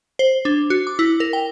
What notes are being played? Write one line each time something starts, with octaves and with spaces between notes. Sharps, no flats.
C5
D4
F#4
D6
E4
A#4
G5